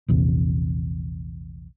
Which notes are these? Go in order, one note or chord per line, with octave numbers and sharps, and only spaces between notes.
A#1 E2 C3